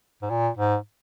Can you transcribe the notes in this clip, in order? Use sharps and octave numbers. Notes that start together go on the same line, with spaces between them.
G#2
A#2
G#2